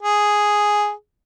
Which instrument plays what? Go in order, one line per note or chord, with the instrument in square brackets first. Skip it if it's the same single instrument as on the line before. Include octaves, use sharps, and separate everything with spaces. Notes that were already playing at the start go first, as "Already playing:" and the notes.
[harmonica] G#4